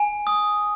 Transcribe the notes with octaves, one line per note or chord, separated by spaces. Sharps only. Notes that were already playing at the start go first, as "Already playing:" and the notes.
Already playing: G#5
D#6